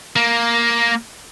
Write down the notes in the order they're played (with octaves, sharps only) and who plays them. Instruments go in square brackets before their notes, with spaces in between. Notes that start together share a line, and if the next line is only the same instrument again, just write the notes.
[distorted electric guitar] A#3